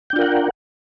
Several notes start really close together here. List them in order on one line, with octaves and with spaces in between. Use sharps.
G5 D4 F4 A#4 F#5